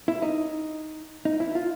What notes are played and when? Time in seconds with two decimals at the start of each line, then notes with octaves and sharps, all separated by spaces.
0.08 E4
0.22 D#4
1.25 D#4
1.40 E4
1.55 F4